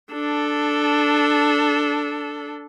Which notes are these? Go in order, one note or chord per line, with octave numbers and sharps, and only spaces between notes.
D4 A4